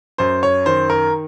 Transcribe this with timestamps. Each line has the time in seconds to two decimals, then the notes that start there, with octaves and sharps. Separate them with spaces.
0.18 F#2 C5
0.43 C#5
0.66 D#3 C5
0.90 A#4